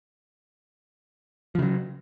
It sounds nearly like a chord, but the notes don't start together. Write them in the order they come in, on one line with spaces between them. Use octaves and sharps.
F3 C#3 F#3